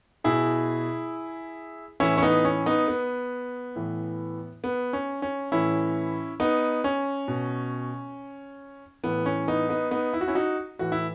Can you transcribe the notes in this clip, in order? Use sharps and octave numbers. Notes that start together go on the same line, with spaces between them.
B2 E4 G#4
A2 E3 C#4 E4
C#4
B3 D#4
C#4
B3 D#4
B3
A2 E3
B3
C#4
C#4
A2 E3 C#4 E4
B3 D#4
C#4
B2
A2 E3 B3
C#4
B3 D#4
B3 D#4
B3 D#4
E4
F#4
C#4 E4
D#4 F#4
A2 E3 F#4
E4